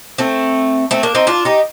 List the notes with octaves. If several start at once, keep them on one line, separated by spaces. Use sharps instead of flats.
A3 C4
A3 C4
A#3 D4
C4 D#4
D4 F4
D#4 G4